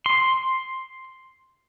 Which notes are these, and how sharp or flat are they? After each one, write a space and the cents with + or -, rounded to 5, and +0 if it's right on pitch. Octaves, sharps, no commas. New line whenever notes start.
C6 +5